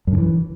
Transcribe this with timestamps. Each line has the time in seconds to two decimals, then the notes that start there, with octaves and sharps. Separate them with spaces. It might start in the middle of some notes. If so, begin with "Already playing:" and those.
0.07 F#2
0.13 D3
0.18 E3